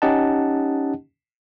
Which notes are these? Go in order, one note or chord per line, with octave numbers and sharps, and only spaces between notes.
C#4 D#4 G4 D#5 F#5 A5